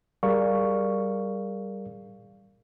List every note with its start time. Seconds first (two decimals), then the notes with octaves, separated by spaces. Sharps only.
0.23 G3 G#4 A#4 D5 F5 C#6